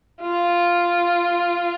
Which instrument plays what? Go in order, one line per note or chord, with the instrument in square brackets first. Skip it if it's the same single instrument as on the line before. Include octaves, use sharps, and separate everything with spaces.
[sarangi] F4